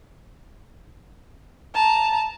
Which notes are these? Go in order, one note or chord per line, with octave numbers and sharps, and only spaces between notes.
A5 A#5